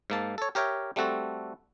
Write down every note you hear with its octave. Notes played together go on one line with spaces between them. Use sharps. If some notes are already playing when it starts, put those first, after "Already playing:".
G#2 A#3 A5
A4 C#5
G4 A#4 C#5 E5 G5
G3 A3 C4 F#4 A4